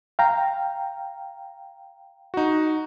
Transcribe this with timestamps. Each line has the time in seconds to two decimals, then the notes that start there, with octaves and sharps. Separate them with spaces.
0.19 F5 G5 A#5
2.34 D#4 F#4